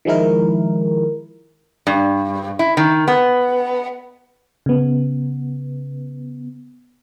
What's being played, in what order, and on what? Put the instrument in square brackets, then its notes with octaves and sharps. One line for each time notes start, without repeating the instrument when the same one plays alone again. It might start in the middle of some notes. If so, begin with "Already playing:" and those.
[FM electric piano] D#3 F3 G#3 E4 A#4
[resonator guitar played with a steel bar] G2
E4
D#3
B3
[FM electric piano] C#3 B3